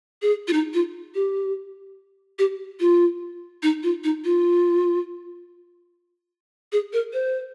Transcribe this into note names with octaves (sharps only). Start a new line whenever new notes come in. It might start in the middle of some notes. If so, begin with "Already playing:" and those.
G#4
F4
D#4
F4
G4
G4
F4
D#4
F4
D#4
F4
G#4
A#4
C5